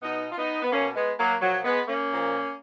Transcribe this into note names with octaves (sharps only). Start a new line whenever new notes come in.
B2 B3 D#4
F4
B3 D#4
B3
B2 A#3 C#4
G#3 B3
F#3 A#3
A#2 F3 F#3
G#3 B3
A#3 C#4
A#2 F3